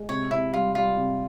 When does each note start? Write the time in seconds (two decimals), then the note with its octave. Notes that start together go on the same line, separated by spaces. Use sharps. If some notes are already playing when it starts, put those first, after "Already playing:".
Already playing: G#3
0.09 C3 C#5
0.31 C3 E4
0.53 G3 F4
0.75 G3 F4
0.97 C3